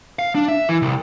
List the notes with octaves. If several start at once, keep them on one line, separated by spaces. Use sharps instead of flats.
F5
D4
E5
E3
C2